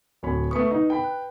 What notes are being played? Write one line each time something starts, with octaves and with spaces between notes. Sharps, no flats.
D1 C#5 B5
A3 B4 C#6 D#6
D#4
G5 B5
F#6